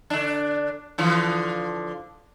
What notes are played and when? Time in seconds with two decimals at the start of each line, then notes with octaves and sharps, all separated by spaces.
0.10 D3 D4
0.98 D3 E3 F3